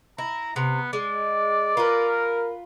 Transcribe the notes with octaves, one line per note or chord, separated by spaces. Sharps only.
E4 A#5
C3 B3
G#3 D5
F4 A#4 B4